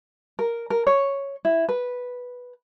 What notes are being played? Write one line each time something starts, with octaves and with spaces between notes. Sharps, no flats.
A#4
A#4
C#5
E4
B4